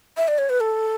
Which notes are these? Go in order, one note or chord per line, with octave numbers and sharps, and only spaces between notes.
E5
D5
C#5
B4
A4